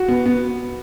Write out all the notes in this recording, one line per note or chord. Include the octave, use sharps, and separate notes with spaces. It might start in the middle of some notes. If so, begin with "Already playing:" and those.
Already playing: F#4
B3
B3